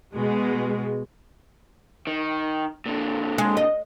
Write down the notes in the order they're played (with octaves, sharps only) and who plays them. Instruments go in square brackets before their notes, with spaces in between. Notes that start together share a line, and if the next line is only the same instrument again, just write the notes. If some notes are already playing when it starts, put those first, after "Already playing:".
[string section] B2 G#3
[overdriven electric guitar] D#3
A#2 D3
[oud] G#3
D#5